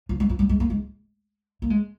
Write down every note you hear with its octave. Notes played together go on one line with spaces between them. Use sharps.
F3
G#3
F3
G3
G#3
A#3
G#3
A#3
G#3